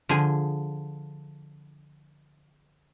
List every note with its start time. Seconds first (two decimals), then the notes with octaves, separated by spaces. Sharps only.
0.09 D3 F3 G#4